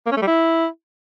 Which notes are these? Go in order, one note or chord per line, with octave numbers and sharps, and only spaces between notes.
A#3
C#4
A3
G3
E4